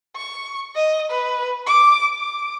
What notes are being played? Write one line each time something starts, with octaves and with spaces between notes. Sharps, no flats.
C#6
D#5
B4
D6
D6